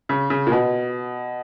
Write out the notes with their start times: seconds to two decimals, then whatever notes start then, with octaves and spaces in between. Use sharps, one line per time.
0.09 C#3
0.30 C#3
0.47 A#2
0.52 B2